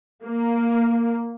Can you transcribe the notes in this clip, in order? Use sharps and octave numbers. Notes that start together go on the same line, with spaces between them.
A#3